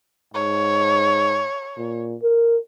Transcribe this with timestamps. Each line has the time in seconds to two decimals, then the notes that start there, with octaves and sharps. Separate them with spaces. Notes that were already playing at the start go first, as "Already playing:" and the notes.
0.34 G#2 C#5
1.78 A#2
2.22 A#4